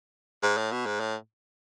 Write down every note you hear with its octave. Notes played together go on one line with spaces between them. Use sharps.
G#2
A2
B2
G#2
A2